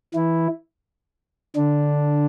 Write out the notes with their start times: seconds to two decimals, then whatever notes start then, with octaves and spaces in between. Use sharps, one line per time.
0.14 E3 E4
1.56 D3 D4